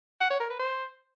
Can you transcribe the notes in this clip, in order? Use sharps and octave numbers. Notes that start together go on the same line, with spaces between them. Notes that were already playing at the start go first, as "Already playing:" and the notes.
F#5
C#5
A#4
B4
C5